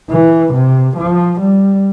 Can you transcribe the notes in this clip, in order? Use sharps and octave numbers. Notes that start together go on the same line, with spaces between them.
E3
C3
F3
G3